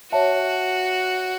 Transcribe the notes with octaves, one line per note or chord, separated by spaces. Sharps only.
F#4 C#5 E5 A5